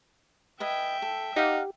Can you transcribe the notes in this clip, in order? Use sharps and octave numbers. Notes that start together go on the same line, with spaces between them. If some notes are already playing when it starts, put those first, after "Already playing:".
B4 D#5 E5 G5 G#5
A4
D#4 G4 F5 F#5